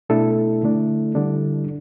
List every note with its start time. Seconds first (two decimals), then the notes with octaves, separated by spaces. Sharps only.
0.09 B2 A3 D4 E4 A4
0.63 D3 A3 D4
1.15 D3 G3 D4